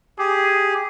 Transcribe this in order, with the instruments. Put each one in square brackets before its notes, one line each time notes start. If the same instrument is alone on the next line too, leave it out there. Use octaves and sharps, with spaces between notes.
[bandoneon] G4 [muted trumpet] G#4